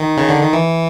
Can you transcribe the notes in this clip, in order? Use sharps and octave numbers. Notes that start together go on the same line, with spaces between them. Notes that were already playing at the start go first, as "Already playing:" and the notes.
Already playing: D#3
C#3
D3
D#3
E3